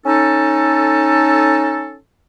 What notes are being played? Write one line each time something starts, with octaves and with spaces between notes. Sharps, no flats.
C#4 D#4 A4